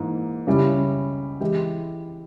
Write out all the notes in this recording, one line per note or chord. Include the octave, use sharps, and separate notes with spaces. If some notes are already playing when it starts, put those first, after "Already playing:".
Already playing: G#2 E3 A#3
C#2 C#3 G3 C#4 E4
E3 G#3 E4 G4